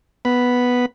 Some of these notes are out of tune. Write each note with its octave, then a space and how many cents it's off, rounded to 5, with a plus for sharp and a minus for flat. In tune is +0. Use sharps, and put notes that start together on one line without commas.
B3 +0 B5 +0